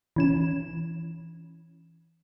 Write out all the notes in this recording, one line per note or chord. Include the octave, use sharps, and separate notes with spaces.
E3 C#4 E7